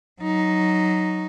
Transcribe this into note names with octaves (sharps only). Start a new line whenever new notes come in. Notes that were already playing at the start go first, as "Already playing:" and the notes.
F#3 D#4